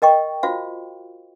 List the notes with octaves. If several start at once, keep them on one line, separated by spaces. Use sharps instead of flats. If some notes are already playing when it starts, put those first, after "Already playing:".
A#4 D#5 G5 C#6
F4 F#4 C5 F5